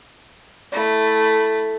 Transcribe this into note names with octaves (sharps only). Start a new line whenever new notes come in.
A3 E4